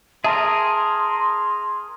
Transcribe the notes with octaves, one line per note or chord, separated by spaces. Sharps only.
G#4 A#4 E5 A5 C6